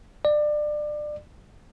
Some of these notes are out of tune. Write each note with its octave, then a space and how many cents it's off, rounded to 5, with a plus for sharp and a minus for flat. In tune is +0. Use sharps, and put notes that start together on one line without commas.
D5 +25